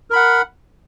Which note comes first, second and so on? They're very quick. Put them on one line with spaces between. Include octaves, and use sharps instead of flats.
A#4 B5 F#5